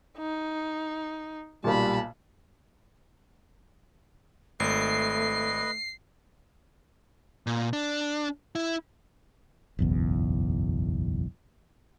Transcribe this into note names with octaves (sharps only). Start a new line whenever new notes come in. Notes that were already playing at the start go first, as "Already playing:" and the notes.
D#4
B1 A#2 G3 A5 B5
G#1 A3 B4 D#5 C7
A#2
D4
E4
F#1 B1 E2